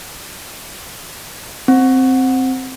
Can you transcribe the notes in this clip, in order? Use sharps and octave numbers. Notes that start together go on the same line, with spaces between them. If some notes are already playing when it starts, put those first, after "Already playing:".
C4